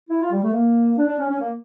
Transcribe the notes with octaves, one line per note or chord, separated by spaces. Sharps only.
E4
F4
G3
A3
A#3
D4
D4
C#4
C#4
A#3